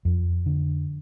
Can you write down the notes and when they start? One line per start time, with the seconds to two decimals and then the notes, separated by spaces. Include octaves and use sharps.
0.05 F2
0.46 D3